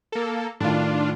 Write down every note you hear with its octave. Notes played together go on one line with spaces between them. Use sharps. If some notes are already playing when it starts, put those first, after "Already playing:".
A#3 A4
A2 D#3 D4 F4